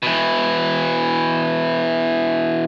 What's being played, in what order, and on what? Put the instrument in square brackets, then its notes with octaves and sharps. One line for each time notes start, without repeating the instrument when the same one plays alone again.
[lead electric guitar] B2 E3